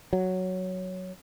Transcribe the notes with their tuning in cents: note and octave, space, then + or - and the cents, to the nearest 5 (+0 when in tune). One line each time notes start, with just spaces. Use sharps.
F#3 +0